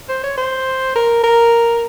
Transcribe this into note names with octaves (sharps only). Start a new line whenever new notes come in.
C5
C#5
C5
A#4
A#4